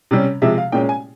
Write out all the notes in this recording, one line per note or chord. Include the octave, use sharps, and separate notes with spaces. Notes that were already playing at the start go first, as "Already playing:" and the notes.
C3 G3 C#4
C3 F3 G#3 E5
F5
A#2 G#3 C#4 G5
G#5